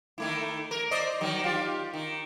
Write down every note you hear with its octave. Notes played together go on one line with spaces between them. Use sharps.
D#3 A3 E4
A#4
C5 D5 D#5
D#3 F#3
F4 G4
D#3